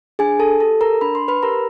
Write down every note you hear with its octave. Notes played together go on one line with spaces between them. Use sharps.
D4 G#4 G#5
A4 A5
G4 A4 A5
A#4 A#5
D4 B5
C6
B4 B5
G4 A#4 A#5